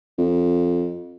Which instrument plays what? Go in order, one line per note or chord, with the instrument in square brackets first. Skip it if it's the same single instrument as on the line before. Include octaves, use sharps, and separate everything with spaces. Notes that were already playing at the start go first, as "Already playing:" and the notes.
[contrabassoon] F2